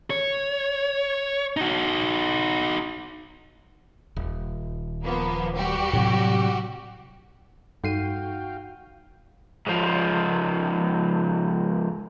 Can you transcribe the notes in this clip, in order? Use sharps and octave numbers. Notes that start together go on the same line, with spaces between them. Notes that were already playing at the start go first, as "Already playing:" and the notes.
C#5
D#4 F#4
D#1
F3 A#3 B3
G3 F#4 G4
A2 C3 F#3
G2 D#4 F#4 A4 F5 G5 C7 D#7
G#2 F3